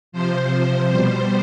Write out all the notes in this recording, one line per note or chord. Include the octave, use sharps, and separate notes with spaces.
C3 F3 C5
C5
B2 G3